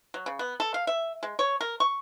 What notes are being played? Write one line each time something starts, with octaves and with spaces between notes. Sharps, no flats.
F#3
C#3
B3
A4
F5
E5
G#3
C#5
A#4
C#6